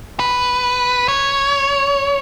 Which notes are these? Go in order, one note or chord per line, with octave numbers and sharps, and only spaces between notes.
B4
C#5